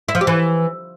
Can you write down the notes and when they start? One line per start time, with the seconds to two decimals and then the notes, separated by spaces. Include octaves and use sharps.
0.09 E4
0.15 F3
0.21 G4
0.27 E3